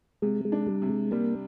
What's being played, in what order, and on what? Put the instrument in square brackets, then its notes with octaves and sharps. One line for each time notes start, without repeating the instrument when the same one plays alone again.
[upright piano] C3 [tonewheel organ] G#3
[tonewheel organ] G#3
[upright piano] D4
[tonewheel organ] G3
[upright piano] C3
[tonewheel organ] G#3
[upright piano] G3 [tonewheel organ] A#3